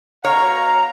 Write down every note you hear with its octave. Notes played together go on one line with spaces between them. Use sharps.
B2 C#5 F5 A#5